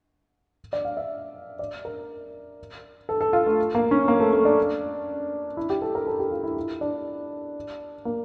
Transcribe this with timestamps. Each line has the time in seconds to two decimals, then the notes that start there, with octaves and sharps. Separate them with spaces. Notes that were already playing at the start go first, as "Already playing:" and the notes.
0.73 D5
0.85 F5
0.97 E5
1.59 D5
1.85 A#4
3.09 A4
3.21 A4
3.33 F4
3.46 A3
3.75 A#3
3.91 C#4
4.08 A#3
4.20 A3
4.33 A3
4.45 D4
5.57 E4
5.70 G4
5.82 A4
5.95 A#4
6.07 A4
6.19 G4
6.31 F4
6.43 E4
6.57 E4
6.81 D4
8.05 A#3